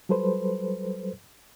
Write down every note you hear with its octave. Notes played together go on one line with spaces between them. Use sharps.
F#3 G3 A4 B4 C5